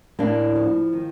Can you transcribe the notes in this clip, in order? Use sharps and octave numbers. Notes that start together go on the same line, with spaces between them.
A2 A#3 D4
F3
D#3